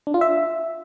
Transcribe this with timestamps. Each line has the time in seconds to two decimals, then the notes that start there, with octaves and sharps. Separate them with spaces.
0.07 D4
0.14 F4
0.21 E5